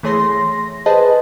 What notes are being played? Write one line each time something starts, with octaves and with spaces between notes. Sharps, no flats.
E3 A3 G#4 C#5 C6 A#6
C6 A#6
G#4 B4 C5 D#5 A5 B5